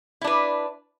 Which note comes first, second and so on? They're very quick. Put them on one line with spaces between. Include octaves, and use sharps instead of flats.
E4 D4 B4